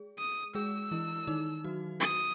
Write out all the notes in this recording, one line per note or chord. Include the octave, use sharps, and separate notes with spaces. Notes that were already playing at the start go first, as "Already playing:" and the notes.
Already playing: G#3 G#4
D#6
G#3 G#4 E6
E3 E4
D#3 D#4
F#3 F#4
D#6